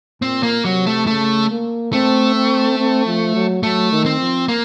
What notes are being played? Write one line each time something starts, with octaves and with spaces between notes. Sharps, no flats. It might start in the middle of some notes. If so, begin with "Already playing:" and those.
A#2 C4
A#3
C3 F#3
A3
C#3 A3
A#3
A3 C4
C4
C4
F3
F#3
F#3 A3
D#3
C4
F3
A#3